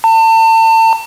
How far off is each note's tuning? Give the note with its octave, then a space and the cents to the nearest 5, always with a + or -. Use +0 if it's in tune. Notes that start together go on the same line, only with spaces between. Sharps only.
A5 +35